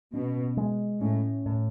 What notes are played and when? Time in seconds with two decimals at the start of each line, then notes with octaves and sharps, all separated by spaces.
0.13 B2 C#4
0.57 G#3
1.01 A2 C#4
1.45 A2